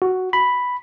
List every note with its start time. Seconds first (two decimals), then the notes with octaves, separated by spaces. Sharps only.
0.02 F#4
0.33 B5